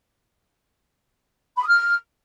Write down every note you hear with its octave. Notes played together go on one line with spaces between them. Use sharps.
B5
D#6
F6